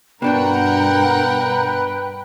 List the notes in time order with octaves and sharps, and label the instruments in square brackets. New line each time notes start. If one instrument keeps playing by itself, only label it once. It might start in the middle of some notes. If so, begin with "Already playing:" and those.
[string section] G2 A#4 F#5 [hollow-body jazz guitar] B2 D4 F#4 [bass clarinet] B4 [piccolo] G5